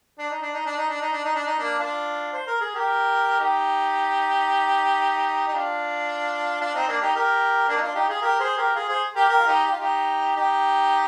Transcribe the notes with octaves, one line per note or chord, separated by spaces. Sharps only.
D4
D#4
D4
D#4
D4
D#4
D4
D#4
D4
D#4
D4
D#4
A#3 D4
D4 F4
C5
A#4
G#4
G4 A#4
D#4 G4
D#4
D4 F4
D4 F4
C4 D#4
A#3 D4
D#4 G4
G4 A#4
A#3 D4
D#4
D4 F4
D#4 G4
F4 G#4
G4 A#4
G#4 C5
G4 A#4
F4 G#4
G#4 C5
G4 A#4
G4 A#4
F4
D#4 G4
G4
F4
D#4 G4
D#4 G4